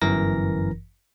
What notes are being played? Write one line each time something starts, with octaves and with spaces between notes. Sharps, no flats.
G1 F#2 E3 A#4 A#6